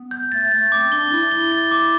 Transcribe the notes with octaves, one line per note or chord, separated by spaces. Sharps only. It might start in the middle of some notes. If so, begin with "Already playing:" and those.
Already playing: B3
G6
A3 A6
A3 A6
C4 D6
D4 G7
E4 A6
G7
A6
D6